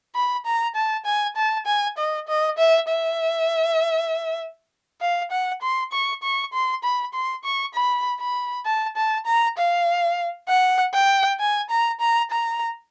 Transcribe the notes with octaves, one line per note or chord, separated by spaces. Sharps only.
B5
A#5
A5
G#5
A5
G#5
D#5
D#5
E5
E5
F5
F#5
C6
C#6
C#6
C6
B5
C6
C#6
B5
B5
A5
A5
A#5
F5
F#5
G5
G#5
A#5
A#5
A#5